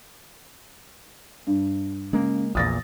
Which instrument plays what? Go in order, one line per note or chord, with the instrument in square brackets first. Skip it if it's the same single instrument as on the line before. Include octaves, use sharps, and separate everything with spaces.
[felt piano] G2
[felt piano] C#3 [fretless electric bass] G#3 A#3
[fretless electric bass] A#1 E2 A#2 [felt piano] D#6 A6 A#6